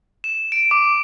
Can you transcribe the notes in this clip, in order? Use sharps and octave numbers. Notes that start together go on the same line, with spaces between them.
E7
D7
D6